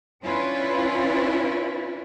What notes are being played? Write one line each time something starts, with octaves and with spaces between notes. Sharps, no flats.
C#4 D4 E4 F4 B4